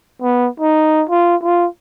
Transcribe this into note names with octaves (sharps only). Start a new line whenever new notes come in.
B3
D#4
F4
F4